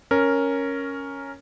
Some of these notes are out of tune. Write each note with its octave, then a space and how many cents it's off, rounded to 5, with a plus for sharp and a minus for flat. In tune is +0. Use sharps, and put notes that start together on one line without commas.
C#4 +0 A#4 +0